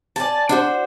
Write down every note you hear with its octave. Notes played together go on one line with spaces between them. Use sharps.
D5 G#5 A5
D4 F#4 C5